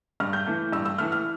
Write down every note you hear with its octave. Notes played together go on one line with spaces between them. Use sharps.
G2 F6
G6
E3 A3
G2 E6
E6
E3 A3 F6
F6